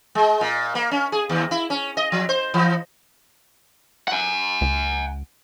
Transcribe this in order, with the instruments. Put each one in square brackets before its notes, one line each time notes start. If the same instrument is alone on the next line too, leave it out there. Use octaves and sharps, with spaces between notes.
[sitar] G#3
A#2
A#3
C#4
G#4
D#2
E4
C#4
D#5
F3
C5
E3
[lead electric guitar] F#5 G#5
[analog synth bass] C#2